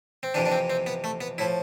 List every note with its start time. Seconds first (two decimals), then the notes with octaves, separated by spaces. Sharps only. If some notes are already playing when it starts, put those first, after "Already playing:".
0.23 C4
0.34 F2 C3 E3 D4
0.46 D4
0.52 C4
0.70 C4
0.86 B3
1.04 A3
1.21 B3
1.38 A2 F3 E4